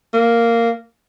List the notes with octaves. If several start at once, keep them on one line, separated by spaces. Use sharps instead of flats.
A#3